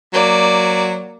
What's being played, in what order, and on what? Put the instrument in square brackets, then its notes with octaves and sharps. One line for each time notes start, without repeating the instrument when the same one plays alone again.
[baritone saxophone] F#3 [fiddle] A#3 D5